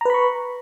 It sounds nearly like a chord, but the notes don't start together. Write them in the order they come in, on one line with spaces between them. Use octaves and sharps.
A#5 B4 B5 C#6